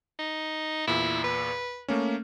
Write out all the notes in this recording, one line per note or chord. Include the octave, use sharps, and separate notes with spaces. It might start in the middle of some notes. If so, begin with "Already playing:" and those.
D#4
E2 A#2 E4
B4
A3 A#3 C#4